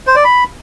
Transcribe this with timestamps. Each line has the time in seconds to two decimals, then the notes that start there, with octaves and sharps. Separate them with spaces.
0.07 C5
0.16 D5
0.24 B5